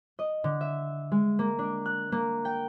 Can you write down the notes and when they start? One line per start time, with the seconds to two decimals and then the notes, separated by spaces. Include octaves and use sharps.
0.19 D#5
0.44 D3
0.61 E5
1.12 G#3
1.39 A#3
1.59 D4
1.86 F#6
2.12 A#3
2.45 G5